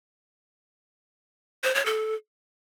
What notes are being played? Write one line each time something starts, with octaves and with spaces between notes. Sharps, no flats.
C5
C#5
A4